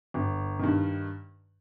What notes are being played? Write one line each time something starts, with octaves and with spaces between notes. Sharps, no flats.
G1
G2 D#3